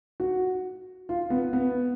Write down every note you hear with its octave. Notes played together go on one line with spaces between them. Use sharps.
F#4
F4
B3
B3